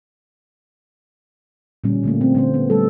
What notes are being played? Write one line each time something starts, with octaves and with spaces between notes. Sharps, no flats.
A#2 D3 G3 C#4
D3 A3 A#3
C4
D3 A3 C4 C5
B3
G3 A3 A4